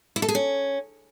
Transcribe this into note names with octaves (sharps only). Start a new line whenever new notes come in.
E4
A4
G#4
C#4